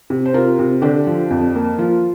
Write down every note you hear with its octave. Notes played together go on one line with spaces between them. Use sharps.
C3
C5
C3 F4 A#4
C3
D3 D4 G4
F3
F2
A#3
F3 F4